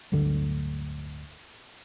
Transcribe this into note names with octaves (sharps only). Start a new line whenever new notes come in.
D1 G1 D2 D3